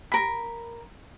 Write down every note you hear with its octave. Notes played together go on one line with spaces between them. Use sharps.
A#4 B5